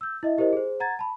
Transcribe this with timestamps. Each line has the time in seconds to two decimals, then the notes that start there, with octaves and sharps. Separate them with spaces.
0.01 E6 G6
0.23 E4 D#5 E5
0.38 E4 G4 A#4 C5 D#5
0.53 G#4 C5
0.80 F#5 A#5 G#6 A6
0.99 A5 B5